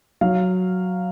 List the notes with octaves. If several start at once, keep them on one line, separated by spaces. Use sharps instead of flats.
F#3 F5